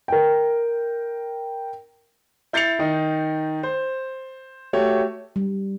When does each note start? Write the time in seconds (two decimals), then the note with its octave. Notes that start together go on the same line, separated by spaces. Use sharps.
0.08 A#4 G5
2.53 E4 G6 A6 C7 C#7 F7
2.79 D#3 D#4
3.63 C5
4.73 A3 F#4 G4 C#5
5.36 G3